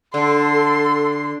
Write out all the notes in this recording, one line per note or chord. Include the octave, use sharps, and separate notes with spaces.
D3 A4 C6